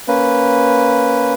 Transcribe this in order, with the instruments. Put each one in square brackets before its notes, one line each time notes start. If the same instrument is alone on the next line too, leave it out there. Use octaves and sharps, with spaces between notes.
[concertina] A#3 C#4 B4